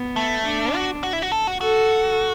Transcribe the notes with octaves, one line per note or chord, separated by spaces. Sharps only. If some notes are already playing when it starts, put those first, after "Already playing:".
Already playing: B3
A3
D4
F#4
F#4
E4
F#4
A4
F#4
F#4 A4